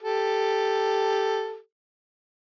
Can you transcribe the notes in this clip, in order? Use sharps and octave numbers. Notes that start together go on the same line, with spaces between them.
G4 A4